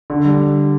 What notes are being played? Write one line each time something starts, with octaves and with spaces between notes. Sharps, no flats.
D3
G3